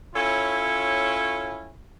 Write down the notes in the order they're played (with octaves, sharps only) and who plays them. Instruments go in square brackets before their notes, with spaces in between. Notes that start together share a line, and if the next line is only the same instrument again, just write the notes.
[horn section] C#4 E4 F4 A4 C#5